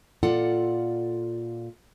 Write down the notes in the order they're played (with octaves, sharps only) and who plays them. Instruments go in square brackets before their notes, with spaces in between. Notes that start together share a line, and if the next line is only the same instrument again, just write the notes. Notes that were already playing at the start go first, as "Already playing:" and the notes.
[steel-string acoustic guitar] A#2 F4 A4 D5 F#5